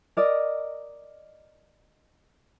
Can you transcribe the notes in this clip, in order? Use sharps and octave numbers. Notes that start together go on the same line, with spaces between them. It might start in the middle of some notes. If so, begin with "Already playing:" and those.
A#4 D5 D#5